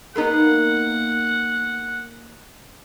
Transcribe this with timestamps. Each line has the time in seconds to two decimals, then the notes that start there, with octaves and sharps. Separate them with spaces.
0.16 A#3 B3 D#4 F#5